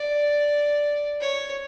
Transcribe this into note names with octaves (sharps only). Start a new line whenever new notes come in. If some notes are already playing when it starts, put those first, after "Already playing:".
Already playing: D5
C#5